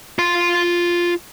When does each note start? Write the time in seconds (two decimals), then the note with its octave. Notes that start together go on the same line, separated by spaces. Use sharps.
0.19 F4 C6